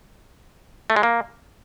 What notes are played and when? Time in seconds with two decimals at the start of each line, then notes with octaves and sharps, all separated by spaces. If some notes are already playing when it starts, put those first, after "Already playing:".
0.90 A3
0.96 G#3
1.03 A#3